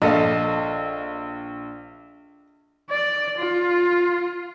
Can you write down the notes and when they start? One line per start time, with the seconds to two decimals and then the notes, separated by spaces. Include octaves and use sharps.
0.02 A#1 A4 D#5 F5
2.90 D5
3.39 F4